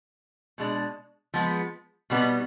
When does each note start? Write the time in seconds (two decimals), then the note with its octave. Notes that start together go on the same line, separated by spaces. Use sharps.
0.58 B2 G#3 D4
1.34 F3 G#3 B3
2.10 B2 G3 B3 D#4